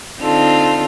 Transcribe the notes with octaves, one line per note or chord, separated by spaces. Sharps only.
D3 C4 D#4 F4 A4